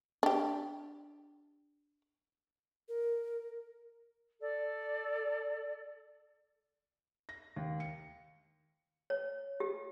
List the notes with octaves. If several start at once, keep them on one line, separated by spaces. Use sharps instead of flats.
D4 G4
A#4
A4 D5
A#6
D#2
C#7
C#5
G4